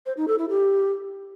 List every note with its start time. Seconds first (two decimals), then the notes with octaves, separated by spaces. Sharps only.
0.06 C5
0.17 D#4
0.28 A4
0.39 E4
0.49 G4